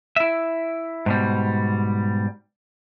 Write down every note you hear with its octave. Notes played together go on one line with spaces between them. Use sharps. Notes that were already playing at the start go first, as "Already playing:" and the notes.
E4 E5
G#2 B2 G3